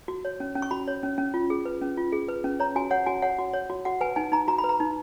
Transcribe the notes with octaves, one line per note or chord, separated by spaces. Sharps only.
F#4
C#5
C#4
C#4
C#6
F#4 B5
C#5
C#4
C#4
F4
G#4
B4
C#4
F4
G#4
B4
C#4
C#5 A#5
F#4 G#5
C#5 F#5
F#4 G#5
C#5 F#5
F#4
C#5
F#4
F#4 F#5
B4 G#5
D#4 G#5
D#4 A#5
F#4 A#5
B5
B4
A#5
D#4